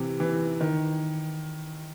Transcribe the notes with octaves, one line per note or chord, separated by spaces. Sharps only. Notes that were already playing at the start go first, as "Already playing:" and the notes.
Already playing: C3 E3
E3
D#3